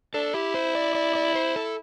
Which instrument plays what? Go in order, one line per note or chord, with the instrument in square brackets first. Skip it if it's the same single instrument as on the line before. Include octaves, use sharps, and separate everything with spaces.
[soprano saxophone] D4 [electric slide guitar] A4
[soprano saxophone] E4 [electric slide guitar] G4
[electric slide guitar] C5
D5
D5
D5
C5
A4